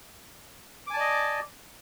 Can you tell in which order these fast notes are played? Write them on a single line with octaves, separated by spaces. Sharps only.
D6 G#5 A5 D5 D#5